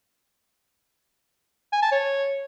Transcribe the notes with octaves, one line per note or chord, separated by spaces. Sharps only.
G#5
A5
C#5